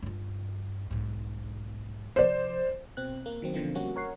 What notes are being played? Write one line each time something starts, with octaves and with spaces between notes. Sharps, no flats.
G2 F4
B1 G#2
C3 F3 C5 D5
B2 C4 F#6
A#3
D#3 F#3 C4
B2 D3 F3 A#3 C4
G3 A#3 C#4 F#4
A#4 C#5 F#5 C7